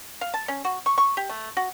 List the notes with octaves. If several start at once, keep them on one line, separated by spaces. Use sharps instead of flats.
F5
A5
C#4
F#4
C#6
C#6
G4
A3
F#4